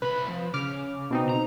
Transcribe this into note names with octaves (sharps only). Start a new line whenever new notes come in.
C2 B4 B5
F3
C#3 D6 F6
B2 C4 D#4
A#5